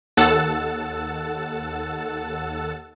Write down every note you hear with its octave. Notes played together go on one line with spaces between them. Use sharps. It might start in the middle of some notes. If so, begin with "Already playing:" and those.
D#2 A4 F#5 E6 A6